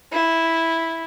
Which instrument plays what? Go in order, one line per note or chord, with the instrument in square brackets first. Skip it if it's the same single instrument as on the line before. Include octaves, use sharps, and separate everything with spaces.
[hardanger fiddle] E4